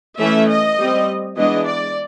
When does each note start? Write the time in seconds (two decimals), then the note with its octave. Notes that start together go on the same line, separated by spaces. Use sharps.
0.19 E3 A3 C#4 E5
0.49 D#5
0.78 G3 C4
1.37 E3 G#3 B3 D4 D#5
1.66 D5